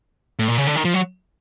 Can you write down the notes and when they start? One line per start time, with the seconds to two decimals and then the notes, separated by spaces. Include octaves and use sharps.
0.39 A2
0.48 A#2
0.58 C#3
0.67 D3
0.76 D#3
0.85 F3
0.94 F#3